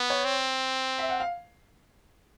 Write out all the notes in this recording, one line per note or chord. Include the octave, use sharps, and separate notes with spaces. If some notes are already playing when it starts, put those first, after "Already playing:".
Already playing: B3
C#5
C4
E5
F#5
F5